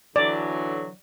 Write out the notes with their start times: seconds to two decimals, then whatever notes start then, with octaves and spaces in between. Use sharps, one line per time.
0.16 D3 E3 F#3 D5